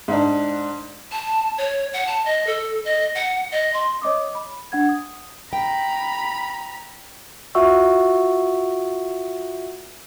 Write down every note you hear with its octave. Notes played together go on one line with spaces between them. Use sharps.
G#2 D4
A5
C#5
F#5
A5
D#5
A4
D#5
F#5
D#5
C6
C#5 D#5 D6 D#6
B5
D4 F#5 G#6
D#6
G5 A#5 B5
F4 F#4 E5 F#5 C#6 E6